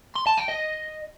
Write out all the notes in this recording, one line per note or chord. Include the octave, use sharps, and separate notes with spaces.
C6
A5
G5
D#5